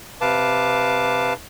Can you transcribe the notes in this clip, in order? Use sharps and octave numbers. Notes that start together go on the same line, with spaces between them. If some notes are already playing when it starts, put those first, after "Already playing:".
C3 B4 F5 A5 D6